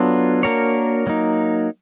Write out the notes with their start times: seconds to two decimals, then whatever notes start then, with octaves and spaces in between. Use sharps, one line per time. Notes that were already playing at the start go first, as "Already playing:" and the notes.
Already playing: F#3 B3 D4 F4 A4
0.43 A#3 D4 F#4 A#4 C#5
1.07 F#3 A#3 D#4